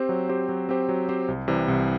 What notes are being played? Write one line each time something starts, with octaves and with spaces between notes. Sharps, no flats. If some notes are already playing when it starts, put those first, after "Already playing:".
Already playing: C4 G4 C5
F#3
C4 G4 C5
F#3
C4 G4 C5
F#3
C4 G4 C5
C2
C3 E3 G3
C2